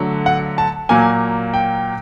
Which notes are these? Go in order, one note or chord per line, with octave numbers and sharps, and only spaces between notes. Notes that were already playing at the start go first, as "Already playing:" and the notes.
Already playing: D3 F#3 A3
F#5
A5
A#2 F#3 A#3 G#5
G5